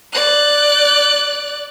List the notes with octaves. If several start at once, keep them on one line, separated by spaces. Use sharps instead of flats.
D5 F#6